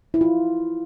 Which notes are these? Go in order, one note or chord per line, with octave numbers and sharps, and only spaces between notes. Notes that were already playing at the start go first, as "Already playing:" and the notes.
E4
F4